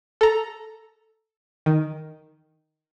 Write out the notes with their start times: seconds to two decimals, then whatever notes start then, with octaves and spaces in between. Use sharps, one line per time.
0.21 A4 A#5
1.66 D#3